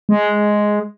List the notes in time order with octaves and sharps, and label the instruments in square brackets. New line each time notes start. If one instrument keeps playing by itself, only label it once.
[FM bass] G#3